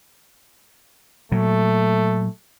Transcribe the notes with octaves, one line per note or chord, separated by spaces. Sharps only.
A#2 F#3 A3